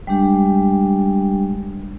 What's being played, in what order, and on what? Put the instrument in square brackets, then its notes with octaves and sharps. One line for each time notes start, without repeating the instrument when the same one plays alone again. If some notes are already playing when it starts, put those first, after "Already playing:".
[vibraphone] G3 G#3 D4 G4